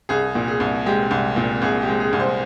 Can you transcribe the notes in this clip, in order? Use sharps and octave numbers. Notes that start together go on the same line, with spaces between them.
C2 G#4
A#2
G#4
C2
G#3 G4
C2
A#2
C2 G#4
G4
G#3
G#4
C2
C5